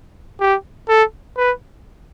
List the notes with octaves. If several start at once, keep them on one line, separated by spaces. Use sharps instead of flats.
G4
A4
B4